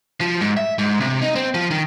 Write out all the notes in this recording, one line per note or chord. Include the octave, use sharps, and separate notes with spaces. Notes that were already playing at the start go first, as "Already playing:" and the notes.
F3
G#2
E5
G#2
C3
D#4
C4
F3
D#3